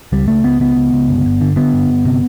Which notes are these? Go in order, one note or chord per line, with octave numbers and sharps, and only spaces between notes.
C#2 G3
C#2 A3
C#2 B3
C#2 B3
C#2
C#2
G1
G1
D3
D3 B3
G1
G1
C3